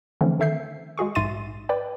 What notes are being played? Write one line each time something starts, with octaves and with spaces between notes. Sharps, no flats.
D3 E3 F3 A3 C4 C#4
D#3 A4 E5 G6 C7
G#3 F#4 G#4 C#6
A#1 G#2 E5 C6 A6 D#7
B4 D5 G5